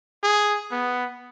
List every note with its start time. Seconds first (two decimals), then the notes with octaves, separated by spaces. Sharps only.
0.23 G#4
0.71 B3